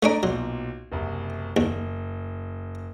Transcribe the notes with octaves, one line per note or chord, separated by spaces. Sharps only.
A3 C#4 D4 D5 D#5 A#5
B1 A#2 F#3
F#1 C2
F#1 D#2